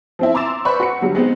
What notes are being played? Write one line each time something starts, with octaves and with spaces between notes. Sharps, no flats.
F3 C4 E4
A#5 C6 D6 E6 A6 E7
B4 C5 D5 B5 C#6
F#4 F#5 C#7
D3 F#3 G3
G#3 B3 C4 D#4